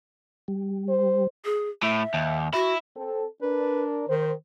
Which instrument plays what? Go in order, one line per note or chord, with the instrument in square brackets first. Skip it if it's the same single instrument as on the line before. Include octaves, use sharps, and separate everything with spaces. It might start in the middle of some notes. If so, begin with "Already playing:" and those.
[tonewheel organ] G3
[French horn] C5
[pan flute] G#4
[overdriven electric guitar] A2 [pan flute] E5
[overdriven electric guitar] D#2
[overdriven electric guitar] E4 [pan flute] F#4
[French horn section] C4 A4
[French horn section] D4 A#4 [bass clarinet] B4
[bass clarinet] D#3 [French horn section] C5